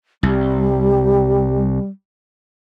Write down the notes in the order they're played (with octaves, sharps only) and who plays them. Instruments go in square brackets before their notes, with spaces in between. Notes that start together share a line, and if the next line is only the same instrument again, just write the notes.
[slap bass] C2 [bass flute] G3